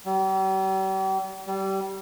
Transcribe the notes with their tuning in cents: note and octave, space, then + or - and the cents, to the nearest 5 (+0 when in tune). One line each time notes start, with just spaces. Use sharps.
G3 -40
G3 -20